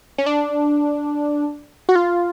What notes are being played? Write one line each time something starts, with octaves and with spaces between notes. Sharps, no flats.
C#4
D4
F#4
F4